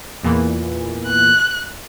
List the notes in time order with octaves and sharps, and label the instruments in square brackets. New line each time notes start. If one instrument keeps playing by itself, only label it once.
[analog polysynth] E2 A#2 E3
[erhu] F#6